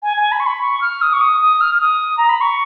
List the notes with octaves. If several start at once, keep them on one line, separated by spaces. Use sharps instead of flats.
G#5
G#5
B5
C#6
B5
C#6
F6
D#6
C#6
D#6
D#6
F6
F6
D#6
A#5
B5
C#6